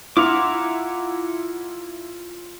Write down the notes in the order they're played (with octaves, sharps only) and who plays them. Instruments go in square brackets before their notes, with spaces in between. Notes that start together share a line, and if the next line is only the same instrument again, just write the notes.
[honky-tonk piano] E4 [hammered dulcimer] F4 [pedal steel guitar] F#5 A#5 D6